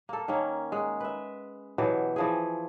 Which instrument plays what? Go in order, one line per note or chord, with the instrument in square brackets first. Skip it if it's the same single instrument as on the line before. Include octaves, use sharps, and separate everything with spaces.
[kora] A#3 A4
D#3 A#3 C#4
G#3 F#5
B4 E5
B2 E3 F#3 G4
E3 F3 G#4